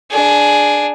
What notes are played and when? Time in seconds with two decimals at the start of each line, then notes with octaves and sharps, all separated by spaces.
0.11 D4 G#4